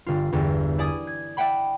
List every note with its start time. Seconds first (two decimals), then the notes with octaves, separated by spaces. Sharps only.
0.06 G1 F4
0.32 G1 E2
0.78 E4 D5 G#5 D#6
1.07 G#6
1.37 D5 E5 F#5 G5 B5